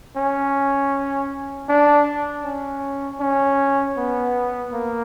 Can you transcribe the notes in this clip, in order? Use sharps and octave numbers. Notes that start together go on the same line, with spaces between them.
C#4
D4
C#4
C#4
B3
A#3